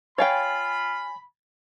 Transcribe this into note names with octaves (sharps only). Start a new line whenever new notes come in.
F4 C#5 F5 G5 G#5 B5 A6